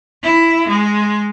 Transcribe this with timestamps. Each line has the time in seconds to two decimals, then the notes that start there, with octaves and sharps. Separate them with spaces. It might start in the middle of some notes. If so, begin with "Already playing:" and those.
0.22 E4
0.68 G#3